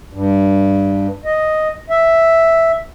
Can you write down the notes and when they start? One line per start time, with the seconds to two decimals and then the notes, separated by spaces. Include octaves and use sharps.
0.13 G2
1.25 D#5
1.90 E5